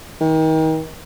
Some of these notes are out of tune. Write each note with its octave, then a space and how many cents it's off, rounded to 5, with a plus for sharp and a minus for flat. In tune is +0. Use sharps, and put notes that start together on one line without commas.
D#3 +35